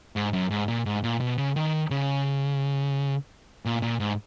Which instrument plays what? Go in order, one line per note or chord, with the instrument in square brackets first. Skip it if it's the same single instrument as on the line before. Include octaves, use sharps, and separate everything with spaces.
[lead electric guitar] G#2
F#2
G#2
A#2
G#2
A#2
B2
C#3
D#3
C#3
A#2
A#2
G#2